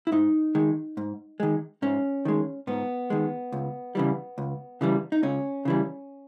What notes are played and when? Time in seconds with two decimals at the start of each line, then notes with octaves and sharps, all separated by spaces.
0.07 E4
0.12 G#2 D#4
0.55 D#3 G#3
0.97 G#2
1.40 D#3 G#3
1.82 G#2 C#4
2.25 D#3 G#3
2.67 G#2 B3
3.10 D#3 G#3
3.52 C#2
3.95 C#3 E3 G3
4.38 C#2
4.81 C#3 E3 G3
5.12 D#4
5.23 C#2 C#4
5.65 C#3 E3 G3